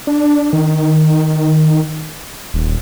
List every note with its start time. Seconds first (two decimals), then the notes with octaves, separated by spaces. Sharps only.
0.07 D4
0.53 D#3
2.54 D#1